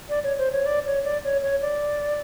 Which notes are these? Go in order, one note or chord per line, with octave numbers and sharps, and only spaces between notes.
D5
C#5
C5
C#5
D5
C#5
D5
C#5
C#5
D5